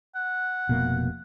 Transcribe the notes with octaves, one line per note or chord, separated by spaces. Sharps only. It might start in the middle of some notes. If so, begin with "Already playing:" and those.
F#5
F1 B2 A#3